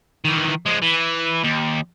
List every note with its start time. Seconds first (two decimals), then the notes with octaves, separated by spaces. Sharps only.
0.25 D#3 E3
0.66 F3 G#3
0.82 E3
1.44 D#2